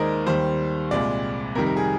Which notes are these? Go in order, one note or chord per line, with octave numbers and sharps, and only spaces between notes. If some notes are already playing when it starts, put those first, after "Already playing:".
Already playing: D#2 D#3 G#3 A#4 C5 D5 D#5
D#2 D#3 G3 C5
C2 A#2 G#3 D5
F2 C3 D#3 G3 A#4
A#4
G#4